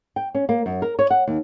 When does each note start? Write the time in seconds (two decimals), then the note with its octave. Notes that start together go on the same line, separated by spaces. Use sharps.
0.16 G5
0.35 C#4
0.49 A#3
0.66 F#2
0.82 A#4
0.99 C#5
1.10 F#5
1.28 D#2